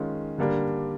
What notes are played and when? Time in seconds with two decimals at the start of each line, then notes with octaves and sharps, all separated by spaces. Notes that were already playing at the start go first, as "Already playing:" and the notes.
Already playing: D#3 G#3 C#4 F4
0.38 D3 G3 A#3 D4